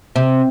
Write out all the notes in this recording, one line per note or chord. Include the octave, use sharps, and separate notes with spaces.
C3